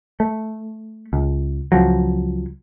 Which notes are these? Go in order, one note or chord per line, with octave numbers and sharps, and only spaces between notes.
A3
C#2
C#2 F3 F#3